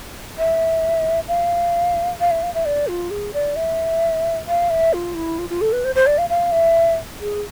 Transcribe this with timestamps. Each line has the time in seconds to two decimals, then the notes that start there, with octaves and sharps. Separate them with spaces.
0.38 E5
1.28 F5
2.20 F5
2.31 E5
2.42 F5
2.54 E5
2.65 D5
2.87 F4
3.10 G#4
3.34 D5
3.56 E5
4.48 F5
4.70 E5
4.93 F4
5.15 E4
5.38 F4
5.50 F4
5.61 A4
5.72 B4
5.84 C5
5.95 C5
6.07 D5
6.18 F5
6.29 F5
6.52 E5
7.20 G#4